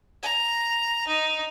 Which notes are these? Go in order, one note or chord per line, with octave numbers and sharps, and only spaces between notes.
A#5
D#4